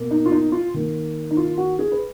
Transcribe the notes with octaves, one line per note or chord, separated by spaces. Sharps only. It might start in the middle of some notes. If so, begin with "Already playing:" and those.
Already playing: B2 A#3
D#4
F4
D#4
F4
D#3 A#3
D#4
F4
F#4
G#4
B4